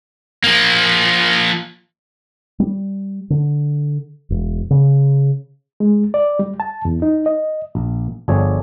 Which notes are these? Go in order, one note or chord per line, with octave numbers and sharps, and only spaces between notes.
F3 A#3
G3
D3
E1
C#3
G#3
D5
G3
A5
E2
D#4
D#5
A#1
G1 F3 G#4 A4 C#5 D5